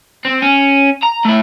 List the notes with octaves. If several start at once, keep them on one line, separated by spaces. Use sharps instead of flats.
C4
C#4
A#5
A3 E4